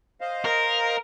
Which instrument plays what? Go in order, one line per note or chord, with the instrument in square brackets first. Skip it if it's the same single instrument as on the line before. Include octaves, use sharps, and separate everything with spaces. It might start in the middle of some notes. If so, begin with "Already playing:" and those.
[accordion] C5 D#5 F5
[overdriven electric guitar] A#4